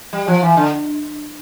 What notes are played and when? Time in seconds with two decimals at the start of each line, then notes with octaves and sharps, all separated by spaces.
0.13 G3
0.28 F3
0.43 E3
0.57 D3